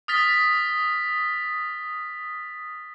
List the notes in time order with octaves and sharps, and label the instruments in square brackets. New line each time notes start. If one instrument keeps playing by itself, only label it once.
[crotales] D#6 F6 A6 B6